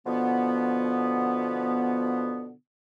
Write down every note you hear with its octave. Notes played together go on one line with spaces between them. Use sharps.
B2 D3 F3 B3